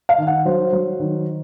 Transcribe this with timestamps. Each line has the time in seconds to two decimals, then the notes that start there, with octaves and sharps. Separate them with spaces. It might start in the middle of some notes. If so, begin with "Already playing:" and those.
0.09 F5
0.18 D#3
0.27 F#5
0.45 F#3 C5
0.73 F#3
1.00 D#3